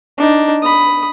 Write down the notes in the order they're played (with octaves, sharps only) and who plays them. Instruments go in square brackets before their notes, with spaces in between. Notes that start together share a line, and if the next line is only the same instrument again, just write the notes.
[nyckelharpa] D4 D#4
B5 D#6